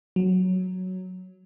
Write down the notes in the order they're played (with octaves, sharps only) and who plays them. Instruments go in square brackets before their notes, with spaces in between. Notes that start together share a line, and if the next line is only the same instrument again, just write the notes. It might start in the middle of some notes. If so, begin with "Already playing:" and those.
[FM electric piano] F#3